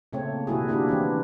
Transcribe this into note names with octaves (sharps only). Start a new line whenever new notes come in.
A#2 C#3 A3 A#3 C4 C#5
B2 D#3 G3 E4 F#4 G#4
A#3 D4 E4 F#4 G4
E3 C4 D4